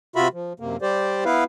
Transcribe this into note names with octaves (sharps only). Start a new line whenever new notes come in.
C3 F4 F#4 E5 B5
F3
F#2 C3 A#3
G3 G4 C5 D5
B3 E4 B4 F5